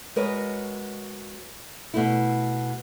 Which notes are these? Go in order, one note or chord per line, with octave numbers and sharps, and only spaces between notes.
G#3 F#4 A#4 B4 C#5 D#5
B2 A3 E4